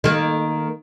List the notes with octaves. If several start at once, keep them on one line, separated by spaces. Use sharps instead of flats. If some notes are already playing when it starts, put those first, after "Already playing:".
D#3 A#3